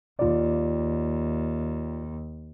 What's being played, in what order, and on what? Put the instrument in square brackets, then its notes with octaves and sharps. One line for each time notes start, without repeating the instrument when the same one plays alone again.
[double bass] D#2 [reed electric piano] F4 D5